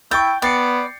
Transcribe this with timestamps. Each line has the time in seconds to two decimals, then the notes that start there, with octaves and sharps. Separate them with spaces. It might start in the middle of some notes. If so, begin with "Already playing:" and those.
0.11 E4 G5 C#6 G6 A6
0.42 B3 D5 A6 C7 C#7